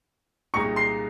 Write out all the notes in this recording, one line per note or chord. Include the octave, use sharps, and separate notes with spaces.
C2 A#2 G#3 D#4 C#6 C#7
C6 C7